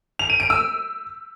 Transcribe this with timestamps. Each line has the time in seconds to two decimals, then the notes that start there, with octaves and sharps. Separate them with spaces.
0.19 F7
0.30 D#7
0.40 D7
0.50 E6